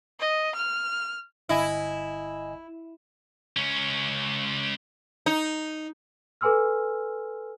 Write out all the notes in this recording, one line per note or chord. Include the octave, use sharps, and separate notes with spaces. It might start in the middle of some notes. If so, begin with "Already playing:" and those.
D#5
F6
G1 E4 D#5 G#5
C#2 C#4
D#4
A4 B4 G#5 C6 E6 F6